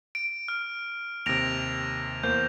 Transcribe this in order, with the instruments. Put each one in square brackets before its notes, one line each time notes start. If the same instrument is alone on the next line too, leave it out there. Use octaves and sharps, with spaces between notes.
[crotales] D7
F6
[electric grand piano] D#2 C3 [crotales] A#6 D7 F7
[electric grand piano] E2 A#3 C5 [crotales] G6